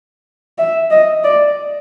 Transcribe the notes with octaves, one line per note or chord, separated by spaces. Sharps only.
E5
D#5
D5